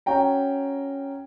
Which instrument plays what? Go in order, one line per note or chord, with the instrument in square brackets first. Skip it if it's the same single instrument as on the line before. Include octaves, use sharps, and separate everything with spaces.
[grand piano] C#4 F#4 C#5 G5 A#5